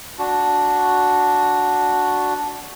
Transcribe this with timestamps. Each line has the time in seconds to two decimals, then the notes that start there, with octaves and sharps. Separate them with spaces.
0.19 D4 F#4